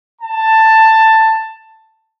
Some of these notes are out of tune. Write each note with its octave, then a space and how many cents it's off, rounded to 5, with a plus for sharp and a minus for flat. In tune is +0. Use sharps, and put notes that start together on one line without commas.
A5 +10